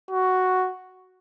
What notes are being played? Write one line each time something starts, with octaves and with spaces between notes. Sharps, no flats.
F#4